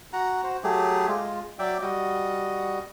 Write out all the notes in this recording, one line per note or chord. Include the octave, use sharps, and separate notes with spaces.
F#4 F#5 A#5
F#4 C5
F#3 A3 G4 G#4
G#3 F4
F#3 D5 E5 G5
G3 F#4 D#5